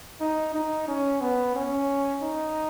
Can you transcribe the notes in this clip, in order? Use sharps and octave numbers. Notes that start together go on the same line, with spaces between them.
D#4
D#4
C#4
B3
C#4
D#4